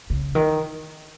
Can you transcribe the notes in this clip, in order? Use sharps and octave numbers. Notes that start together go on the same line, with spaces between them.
C#3
D#3